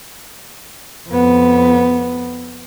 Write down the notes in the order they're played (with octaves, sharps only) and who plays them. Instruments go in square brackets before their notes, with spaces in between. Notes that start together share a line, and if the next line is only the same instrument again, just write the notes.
[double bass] F2 B3